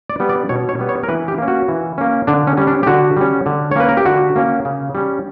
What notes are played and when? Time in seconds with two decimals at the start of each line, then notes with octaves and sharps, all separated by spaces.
0.10 D5
0.20 G3 B3
0.29 D5
0.49 B2 C#5
0.69 C#5
0.79 G3 B3
0.89 C#5
1.03 A#4
1.09 E3 B4
1.28 G4
1.38 A#3 C#4
1.48 F#4
1.68 E3
1.98 A#3 C#4
2.27 D3 D4
2.47 C#4
2.57 G3 C#4
2.67 D4
2.83 G4
2.86 D3 F#4
3.17 G3 C#4
3.46 D3
3.71 C#5
3.76 A#3 C#4 B4
3.89 A#4
3.97 G4
4.06 D3 F#4
4.36 A#3 C#4
4.65 C#3
4.95 G3 C#4